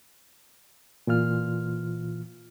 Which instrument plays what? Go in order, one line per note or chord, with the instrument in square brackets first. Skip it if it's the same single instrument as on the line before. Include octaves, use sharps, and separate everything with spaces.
[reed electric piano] A#2 E3 F4 F6